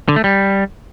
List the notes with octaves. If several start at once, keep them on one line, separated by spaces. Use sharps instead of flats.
D3
A3
G3